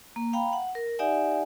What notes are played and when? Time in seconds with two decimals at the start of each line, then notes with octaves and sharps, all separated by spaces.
0.16 A#3
0.33 F5 G5 A#5 B5
0.53 F#5
0.75 A#4
0.99 D#4 G4 D5 E5 F#5 G#5